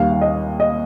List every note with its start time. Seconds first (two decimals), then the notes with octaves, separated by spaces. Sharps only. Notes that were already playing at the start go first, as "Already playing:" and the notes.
Already playing: D#2 D#3 G3 F5
0.12 F5
0.21 D#5
0.60 D#5